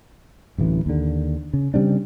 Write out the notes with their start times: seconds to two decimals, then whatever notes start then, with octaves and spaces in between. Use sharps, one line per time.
0.58 D1 A1 E3
0.86 D#2 D3
1.53 C#3
1.74 C#3 G3 C4 D4